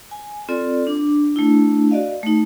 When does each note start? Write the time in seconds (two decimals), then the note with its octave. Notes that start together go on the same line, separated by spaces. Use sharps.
0.11 G#5
0.49 C4 F4 A4 D5
0.87 D4 D6
1.36 A3 D4 E4
1.91 F#4 D5 D#5 F5
2.23 A3 D#4